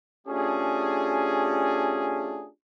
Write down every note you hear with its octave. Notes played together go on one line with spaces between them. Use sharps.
A3 C#4 D4 F4 G4 G#4